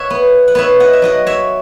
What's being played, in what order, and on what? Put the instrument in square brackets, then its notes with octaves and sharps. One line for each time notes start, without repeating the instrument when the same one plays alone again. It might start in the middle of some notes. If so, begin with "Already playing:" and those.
Already playing: [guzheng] C#5 E5 F#5
B3
F#5
B3 C#5 E5
D#5 F#5
E5
F#3 D#5 F#5
C#5 E5